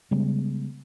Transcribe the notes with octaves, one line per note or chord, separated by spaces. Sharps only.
C#3 G3 G#3 B3